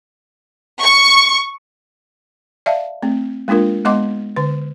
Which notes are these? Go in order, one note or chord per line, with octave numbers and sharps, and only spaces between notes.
C#6
D5 E5 F5 A5
A3 C4
G#3 A#3 D4 F4 A#4
G#3 B3 D#5 F#5 C6 D6
D3 B4